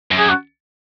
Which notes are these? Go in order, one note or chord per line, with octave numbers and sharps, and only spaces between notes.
F#2
G#4
F#4